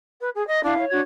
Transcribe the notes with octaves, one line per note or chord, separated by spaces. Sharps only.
B4
G#4
D#5
D4 E4 F5
C#5
D4 F#4 G#6